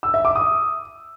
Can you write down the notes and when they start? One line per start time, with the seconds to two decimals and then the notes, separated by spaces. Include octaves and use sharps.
0.03 E6
0.14 E5
0.25 D6
0.35 D#6